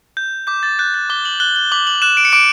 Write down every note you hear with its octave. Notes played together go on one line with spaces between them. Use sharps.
G6
D6 G6
A6
F#6 G6
A6
D6 G7
F#7
F#6 G7
G7
D6 F#7
F#7
F#6 E7
D7
C#7
D6 D7